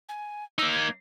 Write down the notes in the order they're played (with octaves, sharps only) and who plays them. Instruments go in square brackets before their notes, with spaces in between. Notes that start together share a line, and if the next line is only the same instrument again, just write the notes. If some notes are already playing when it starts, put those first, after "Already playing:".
[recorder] G#5
[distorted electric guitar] A#3 D#4 [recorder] E6
[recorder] G#6